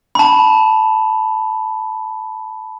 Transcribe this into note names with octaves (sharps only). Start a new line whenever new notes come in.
A5 B5